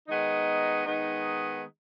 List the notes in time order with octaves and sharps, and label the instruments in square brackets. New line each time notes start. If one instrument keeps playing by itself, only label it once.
[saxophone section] D#3 G#3 B3 D#4
D#3 G#3 B3 D#4